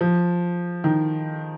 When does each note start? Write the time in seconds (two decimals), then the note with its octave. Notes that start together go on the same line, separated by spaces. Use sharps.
0.01 F3
0.84 D#3